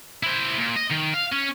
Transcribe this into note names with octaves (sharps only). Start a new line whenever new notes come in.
E4 C5
A#2
D#5
D#3
F5
C#4